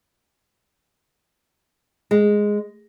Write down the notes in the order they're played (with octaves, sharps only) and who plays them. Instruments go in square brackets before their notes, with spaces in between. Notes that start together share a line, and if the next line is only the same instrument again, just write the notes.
[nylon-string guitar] G#3